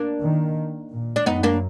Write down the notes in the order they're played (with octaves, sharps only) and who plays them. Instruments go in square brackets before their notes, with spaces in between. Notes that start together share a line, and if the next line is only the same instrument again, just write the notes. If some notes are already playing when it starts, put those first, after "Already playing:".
Already playing: [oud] A#3 D4
[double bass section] D#3
A#2
[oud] D4
[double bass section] F#2 [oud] B3 D#4
[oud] A#3 D4